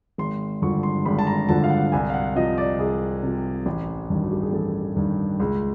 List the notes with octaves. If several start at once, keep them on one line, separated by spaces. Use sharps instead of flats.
G#1 C6
G2 D3 F3 C#6
C6
G#1 B5
A5
A#5
G2 D3 F3 A5
F5
F#5
C2 G#5
F5
F#5
C3 F3 D#5
D5
C2 G#4
C3 F3
A1
G2 D#3
F#4
G4
G#4
A1 A4
G2 D#3
C#2